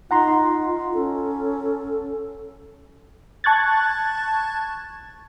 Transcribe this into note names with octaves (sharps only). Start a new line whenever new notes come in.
D#4 F4 F#5 A#5 C6
C#4 A4
A5 C#6 F#6 G#6 A6